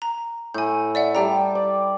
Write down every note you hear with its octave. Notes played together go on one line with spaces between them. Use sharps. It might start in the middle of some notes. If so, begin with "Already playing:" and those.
A#5
A2 G#5 G6
D5 E5 F#5
G3 G4 E5 G5 A5 A#5
D5